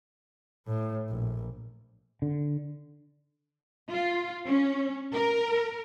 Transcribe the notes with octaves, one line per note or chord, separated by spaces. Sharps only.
A2
A#1
D3
F4
C#4
A#4